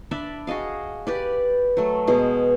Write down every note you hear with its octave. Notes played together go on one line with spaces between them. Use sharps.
D4 D5 E5 B5
F#4 G#4 D#5 F5
G4 B4 D5
F#3 A3
B2 G#3 G#4